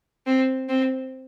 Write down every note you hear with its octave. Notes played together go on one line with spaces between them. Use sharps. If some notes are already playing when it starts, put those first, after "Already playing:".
C4
C4